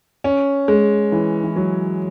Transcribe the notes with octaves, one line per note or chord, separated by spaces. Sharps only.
C#4
G#3
E3
E3
F#3